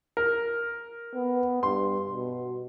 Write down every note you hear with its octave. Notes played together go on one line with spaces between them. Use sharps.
A#4
B3
G2 C6
B2